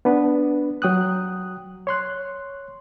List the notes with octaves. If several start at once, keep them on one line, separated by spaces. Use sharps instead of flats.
B3 D4 B4
F#3 G5 D#6 F#6
C#5 C6 F#6